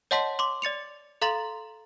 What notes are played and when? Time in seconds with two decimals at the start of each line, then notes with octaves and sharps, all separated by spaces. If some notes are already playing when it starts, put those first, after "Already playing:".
0.11 C#5 D#5 F#5 A5 C6 B6
0.39 C6 D6
0.62 D5 A6 C#7 F7
1.21 A4 F5 A#5 C6 A6 F#7